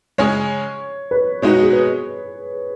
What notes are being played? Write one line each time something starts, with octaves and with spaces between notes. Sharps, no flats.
C#3 G#3 C#4 G#4 C#5
B4
B2 G#3 D#4 F#4 C#5
G#4
B4